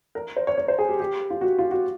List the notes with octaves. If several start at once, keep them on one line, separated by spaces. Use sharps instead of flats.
A#4
C5
C#5
C#5
C5
G#4
G4
G4
F4
F#4
F4
F#4